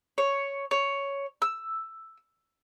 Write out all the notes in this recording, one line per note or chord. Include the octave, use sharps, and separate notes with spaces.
C#5
C#5
E6